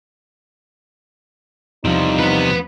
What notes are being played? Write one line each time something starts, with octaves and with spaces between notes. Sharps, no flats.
E2 C3 F3 G3 D#4
B3 B4